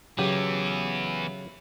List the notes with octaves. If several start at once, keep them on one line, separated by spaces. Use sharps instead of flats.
C#3 E3 F#3 B3 G4